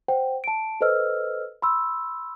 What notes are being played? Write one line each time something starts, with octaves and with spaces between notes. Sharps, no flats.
C5 F#5 G5
A5 D7
A4 B4 C5 D#5 E6 F6
B5 C6 E6